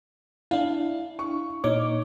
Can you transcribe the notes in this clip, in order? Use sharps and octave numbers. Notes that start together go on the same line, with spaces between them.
D4 E4 F5
C#6
A#2 D#4 C#5 D6